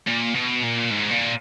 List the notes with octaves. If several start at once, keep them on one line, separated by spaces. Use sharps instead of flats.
A#2
B2
A#2
G#2
A#2